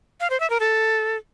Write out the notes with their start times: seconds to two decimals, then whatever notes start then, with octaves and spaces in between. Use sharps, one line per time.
0.20 F5
0.30 C5
0.40 E5
0.50 A#4
0.60 A4